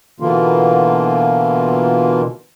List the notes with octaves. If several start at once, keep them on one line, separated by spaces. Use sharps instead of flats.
B2 D3 E3 A#3 F4